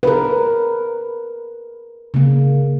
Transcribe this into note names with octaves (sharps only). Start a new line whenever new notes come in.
A#4 B4
C#3 A#3